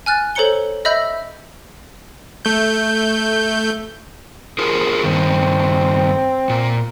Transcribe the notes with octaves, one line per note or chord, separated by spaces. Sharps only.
G#5 F6 F#6 A6
A4 C5 C#5 A#5 C#7 G7
D#5 E5 B5 E6 G6 A#6
A3 G6
F4 G#4 A#4
G2 D#3 C4
A#2